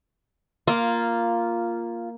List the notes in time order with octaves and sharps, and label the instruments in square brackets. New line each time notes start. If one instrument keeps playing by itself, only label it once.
[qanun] A#3 [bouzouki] F4